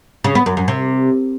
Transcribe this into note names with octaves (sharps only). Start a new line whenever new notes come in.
C#3
B3
F#2
F#2
C3